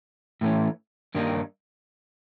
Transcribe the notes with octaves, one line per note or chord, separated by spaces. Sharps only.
A2 E3 A3 C#4
G2 D#3 G3 A#3 D#4